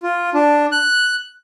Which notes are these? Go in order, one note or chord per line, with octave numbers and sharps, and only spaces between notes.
F4
D4
F#6